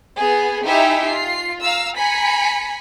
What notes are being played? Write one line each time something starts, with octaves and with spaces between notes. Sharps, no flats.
B3 G#4
D#4 E4 G4 E5 G#5 A#5
F4 C7
F5 A#5 E6
G#5 A#5 B5 B6 C#7